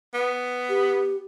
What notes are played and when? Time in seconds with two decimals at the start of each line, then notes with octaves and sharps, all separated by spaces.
0.14 B3
0.69 G4